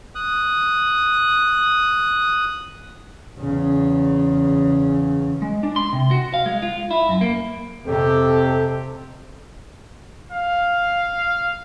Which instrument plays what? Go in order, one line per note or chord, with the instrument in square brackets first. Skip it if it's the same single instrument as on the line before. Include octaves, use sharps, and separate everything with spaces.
[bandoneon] D#6 F#6
[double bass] E2 C#3
[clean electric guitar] G#3
D4
C6
C3
F#4
F5
G#3
F4
E4
F#2
A#3
[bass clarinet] F2 [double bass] C3 [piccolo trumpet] G4 [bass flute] A4
[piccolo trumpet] F5